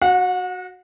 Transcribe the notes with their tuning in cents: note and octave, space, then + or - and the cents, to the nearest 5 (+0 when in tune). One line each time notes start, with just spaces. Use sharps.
F#4 +0 F#5 -35